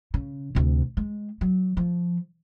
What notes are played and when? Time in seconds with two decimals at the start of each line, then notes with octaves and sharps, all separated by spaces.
0.14 C#3
0.55 D2 C3
0.97 G#3
1.41 F#3
1.77 F3